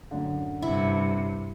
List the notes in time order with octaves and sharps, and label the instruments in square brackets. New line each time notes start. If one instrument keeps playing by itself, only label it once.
[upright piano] F#2 A2 D3
[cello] G2 C3 [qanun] E4